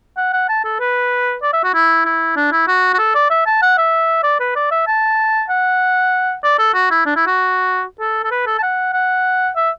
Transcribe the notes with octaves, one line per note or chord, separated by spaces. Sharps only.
F#5
F#5
A5
A4
B4
D5
E5
F#4
E4
E4
D4
E4
F#4
F#4
A4
D5
E5
A5
F#5
E5
D5
B4
D5
E5
A5
F#5
D5
A4
F#4
E4
D4
E4
F#4
A4
A4
B4
A4
A5
F#5
F#5
E5